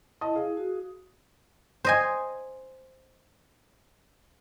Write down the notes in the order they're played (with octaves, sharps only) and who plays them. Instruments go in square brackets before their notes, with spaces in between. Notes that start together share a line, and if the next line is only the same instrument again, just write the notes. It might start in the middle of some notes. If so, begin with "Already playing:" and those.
[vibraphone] E4 [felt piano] D#5 A5 D#6
[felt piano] G#4 F5
[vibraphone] F#4
[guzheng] C5 D#5 G#5